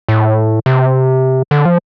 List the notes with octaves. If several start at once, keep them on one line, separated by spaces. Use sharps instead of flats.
A2
C3
D3
F3